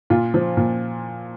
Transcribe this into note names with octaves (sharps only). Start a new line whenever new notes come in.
A#2 F4
F3
A#2